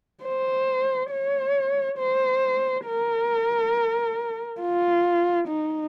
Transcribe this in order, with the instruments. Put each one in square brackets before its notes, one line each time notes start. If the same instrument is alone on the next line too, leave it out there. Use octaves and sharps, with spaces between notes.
[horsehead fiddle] C5
C#5
C5
A#4
F4
D#4